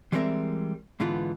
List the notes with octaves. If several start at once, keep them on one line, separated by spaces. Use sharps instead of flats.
E3 G3 G#3 C4 A#4 E5
G#2 D3 E3 B3 F4